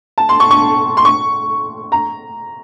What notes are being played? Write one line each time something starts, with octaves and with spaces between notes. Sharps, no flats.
A5
C6
C#6
C#6
C6
C#6
A#5